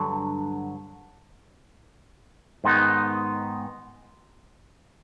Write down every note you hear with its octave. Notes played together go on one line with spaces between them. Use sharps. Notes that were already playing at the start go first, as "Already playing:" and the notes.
Already playing: G2 D3 F#3
G#2 D#3 G#3 B3 D#4